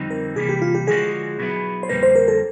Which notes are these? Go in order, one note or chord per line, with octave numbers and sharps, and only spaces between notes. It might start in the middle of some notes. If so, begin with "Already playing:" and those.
Already playing: F2 D3 G3 C4 D#4
A#4
C3 E3 G3 A#3 G#4
G4
F4
G4
D3 F3 G#3 C#4 F#4 G#4
B2 F#3 B3 E4
C5
F2 D3 G3 A#3 B4
C5
A#4
A4